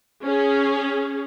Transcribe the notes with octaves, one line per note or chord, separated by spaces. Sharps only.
C#4 G#4